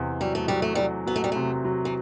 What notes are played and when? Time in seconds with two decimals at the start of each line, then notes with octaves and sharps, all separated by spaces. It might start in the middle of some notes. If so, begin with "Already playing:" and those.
Already playing: E2 C3 C4
0.21 F#3 G3
0.35 A3
0.48 F#3 G3
0.62 A3
0.75 F#3 G3
1.07 F#3 B3
1.16 A3
1.24 G3
1.32 C3 A3
1.65 F#3
1.85 E3